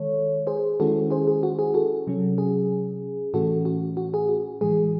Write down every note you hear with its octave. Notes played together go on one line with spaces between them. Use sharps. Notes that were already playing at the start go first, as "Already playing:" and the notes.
Already playing: D#3 G#3 A4 C#5
G#4 C5
D#3 G#3 C#4 E4 F#4 A4
G#4 C5
G#4
F#4
G#4
F#4 A4
C3 F#3 C#4
G#4
A2 E3 A3 C#4 F#4 A4
F#4
F#4
G#4
F#4
A2 E3 G#3 G#4